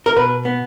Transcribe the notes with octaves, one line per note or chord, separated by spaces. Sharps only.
A#4
B2 B4
B3